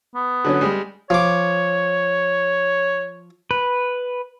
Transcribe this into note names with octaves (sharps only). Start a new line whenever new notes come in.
B3
D3 F#3 C#4
G3 G#3
F3 C#5 D6
B4